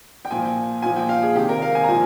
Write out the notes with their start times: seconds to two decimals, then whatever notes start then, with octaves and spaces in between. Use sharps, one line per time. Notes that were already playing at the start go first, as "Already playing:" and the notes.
0.25 G5
0.31 A#2 F3 G#5
0.82 A#2 F3 G#5
0.96 G5
1.09 F5
1.23 G#4
1.35 C3 D#3 G4
1.49 A#4
1.62 F5
1.75 G#5
1.83 A#5
1.88 A#2 F3 G#5